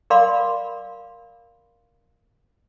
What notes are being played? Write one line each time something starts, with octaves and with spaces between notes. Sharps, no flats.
A#4 D5 F5 B5 C6 D6